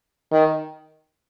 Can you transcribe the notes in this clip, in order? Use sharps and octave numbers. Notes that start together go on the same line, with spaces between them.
D#3